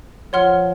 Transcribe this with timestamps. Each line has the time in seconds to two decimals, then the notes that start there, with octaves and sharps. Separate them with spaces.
0.33 F3 C#5 F#5 C6 F6